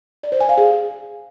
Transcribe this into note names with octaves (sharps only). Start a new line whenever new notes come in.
D5
C5
G#5
F5
G#4